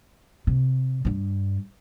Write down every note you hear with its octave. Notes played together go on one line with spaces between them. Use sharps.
C3
G2 D4